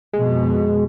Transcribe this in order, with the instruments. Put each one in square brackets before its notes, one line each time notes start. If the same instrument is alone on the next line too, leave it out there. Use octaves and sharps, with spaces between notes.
[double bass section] F2 B2 [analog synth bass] G#3